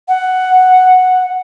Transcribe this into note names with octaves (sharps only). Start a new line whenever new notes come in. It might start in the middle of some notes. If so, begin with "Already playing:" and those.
F#5